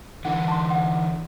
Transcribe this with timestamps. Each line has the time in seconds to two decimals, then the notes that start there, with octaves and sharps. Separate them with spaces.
0.25 D3 E3 F#5
0.48 A5 C6
0.70 F#5